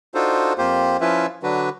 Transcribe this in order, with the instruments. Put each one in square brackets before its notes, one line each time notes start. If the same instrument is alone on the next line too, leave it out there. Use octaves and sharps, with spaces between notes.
[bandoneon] D4 D#4 F4 F#4 A4 C5
F2 A#3 F4 G4 C5
F3 C#4 E4 F4 B4 E5
D3 F#3 D4 F#4 B4